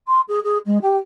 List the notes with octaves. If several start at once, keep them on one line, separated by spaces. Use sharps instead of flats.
C6
G#4
G#4
G#3
G4